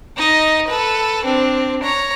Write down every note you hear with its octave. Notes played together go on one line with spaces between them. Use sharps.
D#4 D#5
A4 B4
C4 D4
C#5 A#5